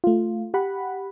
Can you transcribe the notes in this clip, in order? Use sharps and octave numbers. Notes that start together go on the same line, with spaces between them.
A3 F4
G4 F#5 B5